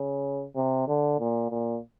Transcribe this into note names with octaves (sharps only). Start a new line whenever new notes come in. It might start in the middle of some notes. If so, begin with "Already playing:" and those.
Already playing: C#3
C3
D3
A#2
A#2